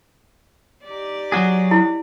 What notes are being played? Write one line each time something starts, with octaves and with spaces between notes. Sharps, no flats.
D#4 G4 D5
F#3 F#4 G#4
E4